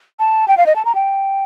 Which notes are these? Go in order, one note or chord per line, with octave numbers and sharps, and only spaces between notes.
A5
G5
F5
D#5
A5
A#5
G5